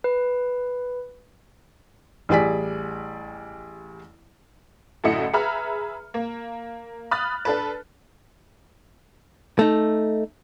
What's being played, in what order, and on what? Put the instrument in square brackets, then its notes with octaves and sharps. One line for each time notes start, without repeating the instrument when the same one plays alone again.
[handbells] B4
[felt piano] A1 G3 G#4 D5 G#5 B6
[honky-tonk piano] F#2 A2 D3 E4 D#5 C#7
G#4 B4 E5 A#5 B5 F6
A#3
B5 D#6 F6 F#6 A6
D4 A4 B4
[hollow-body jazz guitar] A3 D#4